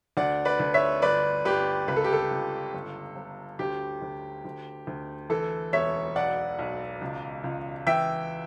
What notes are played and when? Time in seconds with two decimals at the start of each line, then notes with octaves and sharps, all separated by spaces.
0.17 D2 D5 F#5
0.45 B4 D5
0.60 D2
0.74 C#5 E5
1.02 G1 B4 D5
1.45 G1 G4 B4
1.88 C#2 B4
1.96 A4
2.04 G4
2.13 A4
2.31 C#2
2.74 G1
3.16 G1
3.59 D2 G4
4.02 D2
4.45 D2
4.87 D2
5.30 E3 A4
5.73 E1 C#5 E5
6.16 B1 D5 F#5
6.59 B1
7.02 C#2
7.44 C#2
7.86 E3 E5 G5